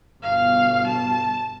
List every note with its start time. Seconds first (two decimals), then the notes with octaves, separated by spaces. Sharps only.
0.23 G1 B2 F5
0.87 A5